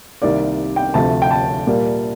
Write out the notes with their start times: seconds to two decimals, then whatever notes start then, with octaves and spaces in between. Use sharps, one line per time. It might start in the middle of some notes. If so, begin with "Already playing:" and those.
0.22 C2 C3 D#3 A#3 D5
0.76 G5
0.94 D2 C3 F3 A3 A5
1.22 G5
1.31 A5
1.67 A#2 G3 A#3